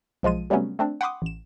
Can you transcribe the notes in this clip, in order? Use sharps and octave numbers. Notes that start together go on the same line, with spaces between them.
B1 F3 G#3 F4 D#7
C3 F#3 G3 A3 B3 C#4
A3 C4 D4
F#5 G5 B5 C6 D6 D#6
A1 E7